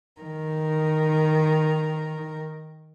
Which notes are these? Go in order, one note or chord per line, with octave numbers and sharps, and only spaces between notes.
D#3 A#4